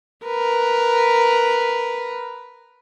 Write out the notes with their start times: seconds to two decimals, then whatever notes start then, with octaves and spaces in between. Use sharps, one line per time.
0.26 A#4 B4